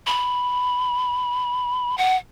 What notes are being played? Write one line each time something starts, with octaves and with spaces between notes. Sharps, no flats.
B5
F#5